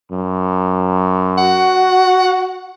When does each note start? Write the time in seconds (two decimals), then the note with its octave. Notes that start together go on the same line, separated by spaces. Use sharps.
0.12 F#2
1.38 F#4 F#5